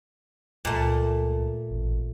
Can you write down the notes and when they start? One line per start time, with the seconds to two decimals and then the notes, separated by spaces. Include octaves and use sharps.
0.65 C#2 A#2 A3
1.71 A1